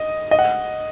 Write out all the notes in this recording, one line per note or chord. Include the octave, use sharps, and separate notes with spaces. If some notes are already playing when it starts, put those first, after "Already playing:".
Already playing: D#5
D#5
F#5